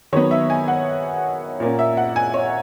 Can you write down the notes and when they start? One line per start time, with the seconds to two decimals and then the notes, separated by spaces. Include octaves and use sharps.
0.13 D#3 F#3 B3 C#5
0.31 E5
0.50 G#5
0.68 F#5
1.60 A#2 A#3 C#4
1.79 E5
1.97 F#5
2.16 G#5
2.34 C#5